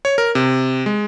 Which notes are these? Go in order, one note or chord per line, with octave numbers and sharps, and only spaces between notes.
C#5
A#4
C3
G#3